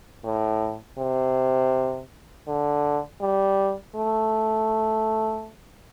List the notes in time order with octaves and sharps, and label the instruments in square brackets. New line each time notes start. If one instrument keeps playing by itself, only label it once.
[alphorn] A2
C3
D3
G3
A3